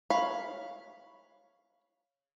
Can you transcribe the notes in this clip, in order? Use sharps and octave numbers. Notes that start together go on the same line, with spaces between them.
C#5 F5 B5